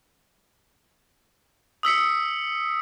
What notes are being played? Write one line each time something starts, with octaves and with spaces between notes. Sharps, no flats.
D#6 E6 B6 C#7